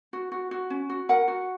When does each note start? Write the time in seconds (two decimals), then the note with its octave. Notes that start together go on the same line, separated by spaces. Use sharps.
0.13 F#4
0.32 F#4
0.51 F#4
0.70 C#4
0.89 F#4
1.09 A#4 F#5
1.28 F#4